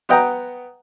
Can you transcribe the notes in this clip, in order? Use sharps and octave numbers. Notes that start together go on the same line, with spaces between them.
B3 D#5 F#5 G5 A#5